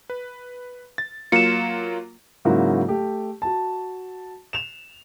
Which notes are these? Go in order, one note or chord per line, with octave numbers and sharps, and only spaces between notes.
B4
A6
F#3 A#3 F4 C#7 E7
G#2 C#3 F#3 A#3 E4 F#4
A3 G4
F#4 A5
E7 F7